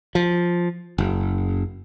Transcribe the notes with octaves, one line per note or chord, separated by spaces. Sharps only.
F3
F#1